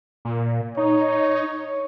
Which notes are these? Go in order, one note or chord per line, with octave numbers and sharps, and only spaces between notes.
A#2
D#4 C#5